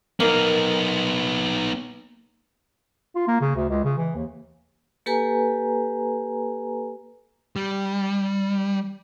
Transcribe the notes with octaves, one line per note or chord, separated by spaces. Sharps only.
A#3 B3 D#4
F4
A#3
C#3
D2
C#2
C#3
E3
D#2
A#3 G4 A4 B4 G#5 A#5
G3